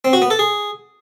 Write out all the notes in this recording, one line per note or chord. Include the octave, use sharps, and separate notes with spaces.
C4
F#4
B3
A4
G#4